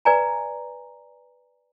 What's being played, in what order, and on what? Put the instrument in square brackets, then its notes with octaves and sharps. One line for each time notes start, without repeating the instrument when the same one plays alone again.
[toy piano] B4 D5 G#5 A#5